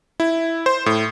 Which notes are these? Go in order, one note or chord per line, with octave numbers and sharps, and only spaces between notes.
E4
C5
A2